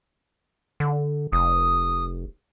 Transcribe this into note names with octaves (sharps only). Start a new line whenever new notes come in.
D3
F1 D#6